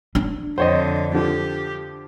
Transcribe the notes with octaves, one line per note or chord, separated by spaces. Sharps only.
D4
F2 D3 C5 C#5 D#5
D3 F3 G4